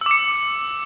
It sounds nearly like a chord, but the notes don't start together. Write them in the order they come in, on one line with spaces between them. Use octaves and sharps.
E6 D6 C#7